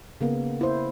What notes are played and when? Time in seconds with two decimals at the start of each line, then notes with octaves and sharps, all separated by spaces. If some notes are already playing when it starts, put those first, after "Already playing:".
0.21 C#3 A#3 B3
0.61 E4 C5